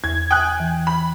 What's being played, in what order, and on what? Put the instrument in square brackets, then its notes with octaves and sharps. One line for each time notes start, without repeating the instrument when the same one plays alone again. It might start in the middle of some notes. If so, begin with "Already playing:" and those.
[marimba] E2 [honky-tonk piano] G#6
[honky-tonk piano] G5 G#5 F#6 [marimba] D#6
[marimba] E3
[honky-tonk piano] B5